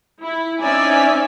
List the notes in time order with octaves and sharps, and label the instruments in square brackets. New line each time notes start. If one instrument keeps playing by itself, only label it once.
[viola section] E4
C4 C#4 D#4 D5 E5 G#5